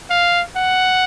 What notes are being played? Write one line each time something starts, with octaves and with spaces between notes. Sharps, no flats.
F5
F#5